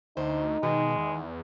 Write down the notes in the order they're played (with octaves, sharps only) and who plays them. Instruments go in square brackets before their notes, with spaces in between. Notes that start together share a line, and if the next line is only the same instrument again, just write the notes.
[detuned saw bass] D2 [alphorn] D#4 [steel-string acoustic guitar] C5
[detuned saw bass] B2 [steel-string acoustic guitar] D#3 [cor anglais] G#3
[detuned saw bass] E2